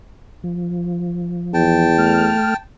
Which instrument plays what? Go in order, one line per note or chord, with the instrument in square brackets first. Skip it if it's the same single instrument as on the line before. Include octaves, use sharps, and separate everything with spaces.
[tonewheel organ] F3
[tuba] E2 [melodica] G5 A5
[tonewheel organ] A3 F6